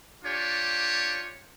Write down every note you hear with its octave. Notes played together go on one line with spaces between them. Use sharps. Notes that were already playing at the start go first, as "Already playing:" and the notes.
D4 F4 G4 C#5